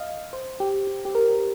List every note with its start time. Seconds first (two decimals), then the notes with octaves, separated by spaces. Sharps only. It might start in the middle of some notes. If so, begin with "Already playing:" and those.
Already playing: D#5 F5
0.33 C5
0.60 G4
0.87 G4
1.05 G4
1.15 A#4